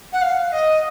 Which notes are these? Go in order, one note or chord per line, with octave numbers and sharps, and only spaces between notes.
F#5
F5
D#5